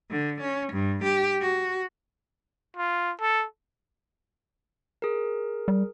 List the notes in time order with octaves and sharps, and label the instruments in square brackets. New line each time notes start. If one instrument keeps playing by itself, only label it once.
[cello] D3
C#4
G2
G4
F#4
[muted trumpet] F4
A4
[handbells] G#4 A#4
[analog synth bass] G3